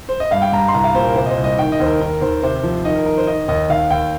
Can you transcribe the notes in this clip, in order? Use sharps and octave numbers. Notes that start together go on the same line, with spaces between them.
C5
D#5
G2 F5
G5
G2 A#5
C6
C2 A#5
F5
A#2 C5
A#4
C3 C5
D#5
C5
C2
D#5
D#3 G5
D#5
D#2 C5
A#4
D#3 A#4
D#2 C5
C3 C5
F3
D#3 D#5
A#4
D#3 A#4
C5
D#3 D#5
D#2 D#5
D#2 F5
D#2 G5